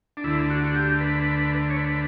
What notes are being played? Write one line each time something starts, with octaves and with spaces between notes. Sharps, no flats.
D4
D2 D3 E4
F#4
F#4
G4
B4
C#5
B4